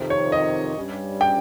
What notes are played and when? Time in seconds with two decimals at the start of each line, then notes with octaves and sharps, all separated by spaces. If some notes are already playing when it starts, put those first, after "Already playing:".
Already playing: F2 C3 D#3
0.10 C#5
0.32 D#5
0.77 G2 G3 C#4
1.21 G5